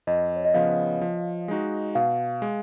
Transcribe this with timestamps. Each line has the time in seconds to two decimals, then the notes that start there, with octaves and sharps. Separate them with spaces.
0.07 F2 D#5
0.36 C#5
0.45 D#5
0.54 C#3 F3 B3 F5
1.01 F3
1.48 G#3 D#4 F#4
1.95 B2 F5
2.42 G#3